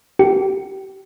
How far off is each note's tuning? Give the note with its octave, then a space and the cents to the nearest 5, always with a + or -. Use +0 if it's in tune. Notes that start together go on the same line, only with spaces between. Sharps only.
G4 -25